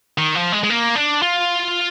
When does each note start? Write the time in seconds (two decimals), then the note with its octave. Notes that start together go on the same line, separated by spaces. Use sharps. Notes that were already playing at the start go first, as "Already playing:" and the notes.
0.18 D#3
0.35 F3
0.52 G#3
0.63 G#3
0.70 A#3
0.95 D4
1.22 F4